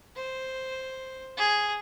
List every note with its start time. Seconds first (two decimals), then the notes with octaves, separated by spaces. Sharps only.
0.16 C5
1.37 G#4